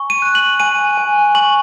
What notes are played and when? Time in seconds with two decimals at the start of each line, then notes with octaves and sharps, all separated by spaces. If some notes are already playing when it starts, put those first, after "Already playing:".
Already playing: G#5 C#6
0.10 D#7
0.22 F#6
0.35 F#7
0.60 G#5 D#7
0.98 G#5
1.35 C#6 F#7